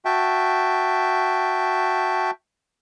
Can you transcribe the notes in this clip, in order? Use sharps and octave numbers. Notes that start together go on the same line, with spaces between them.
F#4 E5 G5 A5